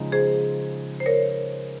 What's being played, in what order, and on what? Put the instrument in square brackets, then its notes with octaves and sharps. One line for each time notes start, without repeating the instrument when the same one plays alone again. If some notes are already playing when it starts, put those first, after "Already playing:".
Already playing: [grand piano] C#3 F3 G#3 D#4
[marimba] G#4 C5
C5
A#4 C#5